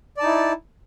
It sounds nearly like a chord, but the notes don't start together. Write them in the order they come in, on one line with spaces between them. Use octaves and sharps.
D5 A5 D#4 E4